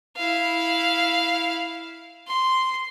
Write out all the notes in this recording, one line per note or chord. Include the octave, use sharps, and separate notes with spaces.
E4 F5
C6